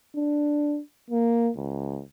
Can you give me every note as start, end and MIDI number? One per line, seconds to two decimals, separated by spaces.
0.16 0.80 62
1.10 1.50 58
1.56 2.02 37